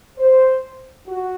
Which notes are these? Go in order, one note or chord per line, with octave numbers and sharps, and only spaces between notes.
C5
F#4